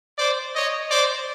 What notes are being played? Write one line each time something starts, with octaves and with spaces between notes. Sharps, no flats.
C5 D5
C#5 D#5
C5 D5